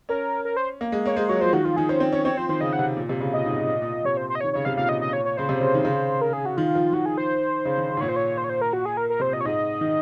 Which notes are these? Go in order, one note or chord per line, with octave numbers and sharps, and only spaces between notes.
C#4 A#4
A#4
C5
A#3
G#3
A#3 C#5
G#3 C5
F#3 C#5
F3 C5
D#3 F#4
F3 F4
D#3 G#4
C#4 C5
C4
C#4 C#5
C4 C#5
F3 C5
D#3 C5
C#3 D#5
F#5
C3
A#2
C3
C#3
A#2 D#5
G#2
A#2
A#2
A#2
A#2
C3 C#5
C5
C5
D#5
D#3 C#5
C#3 C#5
C3 F5
A#2 F5
D#5
D#5
C#5
C#5
C#3 C5
C3
C#3
D#3
C#3
A#4
G#4
F#4
D#3 F4
F3
D#3 F#4
G#4
C5
C#3
D#3
C#3
G#2
A#2 C#5
C5
C#5
C5
C#5
C5
A#4
F#4
G#4
A#4
A#4
C3 C5
A#2 D#5
C#5
G#2 D#5
D#3